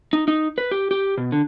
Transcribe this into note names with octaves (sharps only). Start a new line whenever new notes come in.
D#4
D#4
B4
G4
G4
B2
D3